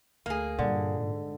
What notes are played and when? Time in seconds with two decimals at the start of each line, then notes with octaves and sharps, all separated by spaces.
0.26 D2 A#3 G#4
0.59 G2 A#2 D3
0.93 G#2